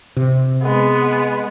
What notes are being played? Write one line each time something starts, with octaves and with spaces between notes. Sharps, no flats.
C3
G#3 B3